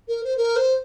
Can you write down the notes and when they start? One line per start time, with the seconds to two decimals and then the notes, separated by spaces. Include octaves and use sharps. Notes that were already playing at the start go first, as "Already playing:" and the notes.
0.08 A#4
0.24 C5
0.37 A#4
0.56 C5